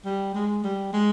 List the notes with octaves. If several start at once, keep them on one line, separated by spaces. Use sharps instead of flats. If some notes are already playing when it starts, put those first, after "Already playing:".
G3
G#3
G3
G#3